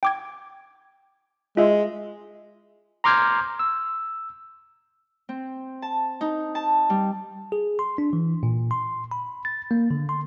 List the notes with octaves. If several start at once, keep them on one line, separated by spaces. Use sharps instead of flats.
G5 D6 G#6
G#3 F4 E5
A#5 C6 D6 F6 G6 G#6
E6
C4
A5
D#4
A5
G3
G#4
C6
D4
E3
A#2
C6
B5
A6
A#3
D3
C6